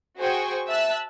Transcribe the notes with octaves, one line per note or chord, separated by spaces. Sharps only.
F#4 G#4 C5 G5 G#5 C#6
E5 A5 E6 F#6